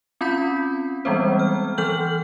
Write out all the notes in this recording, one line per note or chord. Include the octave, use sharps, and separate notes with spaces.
C4 C#4 F4 B5 G6 B6
E3 G3 G#3 B3 C4 C5
F6
E3 F3 A4 F6 G6 F#7